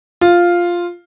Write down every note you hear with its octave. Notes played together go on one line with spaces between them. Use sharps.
F4